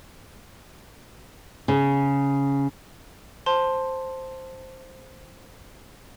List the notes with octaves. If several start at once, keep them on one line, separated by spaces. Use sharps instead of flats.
C#3
C5 A5 C6